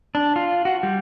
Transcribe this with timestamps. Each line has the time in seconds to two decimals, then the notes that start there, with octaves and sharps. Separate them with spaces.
0.15 D4
0.36 F4
0.65 F#4
0.83 G3